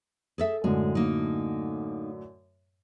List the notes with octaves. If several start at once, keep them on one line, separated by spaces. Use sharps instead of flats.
G#4 A4 E5
F#2 A2 D3 G#3
A#3 D#4